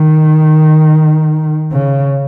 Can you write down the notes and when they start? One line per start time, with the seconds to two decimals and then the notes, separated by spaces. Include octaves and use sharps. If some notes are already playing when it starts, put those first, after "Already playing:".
Already playing: D#3
1.72 C#3